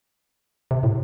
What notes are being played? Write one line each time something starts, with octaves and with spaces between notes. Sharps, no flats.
C3
A2